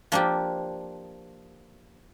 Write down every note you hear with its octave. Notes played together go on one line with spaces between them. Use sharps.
F3 A#3 D4 G4